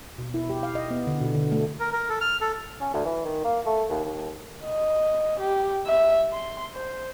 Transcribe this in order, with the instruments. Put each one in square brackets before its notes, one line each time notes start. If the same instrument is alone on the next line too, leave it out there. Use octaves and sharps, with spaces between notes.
[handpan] B2
E4
G4
F5
D#5
B3
D3
B2
D3
A3
[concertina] A#4
A#4
A4
F6
A4
[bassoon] C#4
D2
E3
D#3
A#3
A3
D#2
D#2
[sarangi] D#5
G4
E5
C6
C5